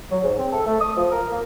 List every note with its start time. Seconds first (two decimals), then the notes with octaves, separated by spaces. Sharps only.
0.11 F#3
0.23 G#2
0.38 C4
0.52 A4
0.66 A3
0.80 D#6
0.97 F3
1.12 A#4
1.31 A#3